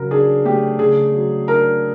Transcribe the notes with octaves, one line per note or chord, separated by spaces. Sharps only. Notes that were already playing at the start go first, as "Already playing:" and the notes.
Already playing: C#3 F#3 A#4
D4 G#4
A3 G4
C#3 G#4
F#3
D4 A#4